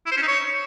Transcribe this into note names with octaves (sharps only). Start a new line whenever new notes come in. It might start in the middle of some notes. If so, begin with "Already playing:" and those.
E4
C5
C#4
D#4
C#5